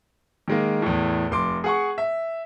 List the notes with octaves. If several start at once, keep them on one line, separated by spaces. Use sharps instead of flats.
D#3 G#3 A#3
E2 A2
F1 C6 D6
G#4 F#5 C#6
E5